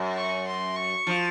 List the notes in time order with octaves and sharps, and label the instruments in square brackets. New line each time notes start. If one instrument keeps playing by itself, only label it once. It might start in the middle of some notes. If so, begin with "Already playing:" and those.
Already playing: [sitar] F#2
[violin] C#6
C6
C#6
[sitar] F3